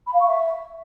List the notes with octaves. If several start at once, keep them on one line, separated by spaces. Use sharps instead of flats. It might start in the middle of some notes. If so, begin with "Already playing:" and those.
B5
F5
C#6
E5